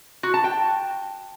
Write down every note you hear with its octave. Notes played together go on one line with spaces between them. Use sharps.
F#4
A5
G5